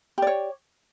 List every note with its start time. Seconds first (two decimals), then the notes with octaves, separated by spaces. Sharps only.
0.18 G4
0.22 D5
0.27 C#5